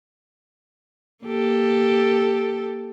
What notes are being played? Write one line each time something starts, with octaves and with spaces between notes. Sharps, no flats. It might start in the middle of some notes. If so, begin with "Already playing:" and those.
A#3 G4 A4